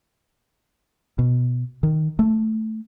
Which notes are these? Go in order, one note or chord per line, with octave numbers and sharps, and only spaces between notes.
B2
D#3
A3